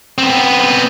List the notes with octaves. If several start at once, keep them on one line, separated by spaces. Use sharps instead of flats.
B3 C4